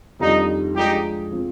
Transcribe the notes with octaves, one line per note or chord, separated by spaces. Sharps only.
F2 D#3 G3 D4 D#4 F4
F3 G#3 D4 D#4 G4 G#4
F3 C4